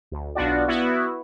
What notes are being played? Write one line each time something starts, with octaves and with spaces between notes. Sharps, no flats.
D2
B1 B3 D4 F4 F#4 D5
B3 E4 F#4